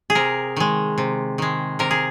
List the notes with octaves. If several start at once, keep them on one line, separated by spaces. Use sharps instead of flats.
G#4
C3 A#4
D#3 G#3
C3
D#3 G#3
C3 A#4
G#4